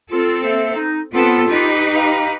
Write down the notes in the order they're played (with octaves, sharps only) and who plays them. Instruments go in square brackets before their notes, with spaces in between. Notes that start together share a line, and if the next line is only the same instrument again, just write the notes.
[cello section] C4 A4 [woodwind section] F4
[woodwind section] A#3 C5 E5
D#4
[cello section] B3 C4 A4 [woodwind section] F4
[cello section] D#4 G4 B4
[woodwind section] F5 G5 A#5